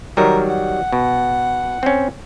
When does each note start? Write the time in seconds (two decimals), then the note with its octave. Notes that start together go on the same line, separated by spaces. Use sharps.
0.17 D#3 F#3 G3 A#4
0.49 F#5
0.92 B2
1.83 C4 C#4